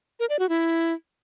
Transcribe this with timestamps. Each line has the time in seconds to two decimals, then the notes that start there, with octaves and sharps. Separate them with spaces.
0.20 A#4
0.29 D5
0.39 F#4
0.49 E4